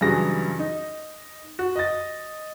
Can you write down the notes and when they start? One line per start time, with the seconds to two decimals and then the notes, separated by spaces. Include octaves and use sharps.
0.01 G2 C#3 E3 F#3 G#4 A#6
0.59 D#4
1.59 F#4
1.76 D#5 A6